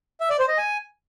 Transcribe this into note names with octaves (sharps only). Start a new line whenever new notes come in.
E5
D5
C5
D#5
G#5